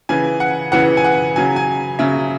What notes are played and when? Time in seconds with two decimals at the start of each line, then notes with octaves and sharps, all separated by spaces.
0.09 C#3 E3 G#5
0.40 F#5
0.72 C#3 E3 F#5
0.97 G#5
1.04 F#5
1.36 C#3 F#3 G#5
1.56 G#5
1.99 C#3 F#3 E5